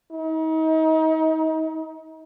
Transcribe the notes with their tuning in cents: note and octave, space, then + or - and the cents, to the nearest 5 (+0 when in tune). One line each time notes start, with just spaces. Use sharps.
D#4 +35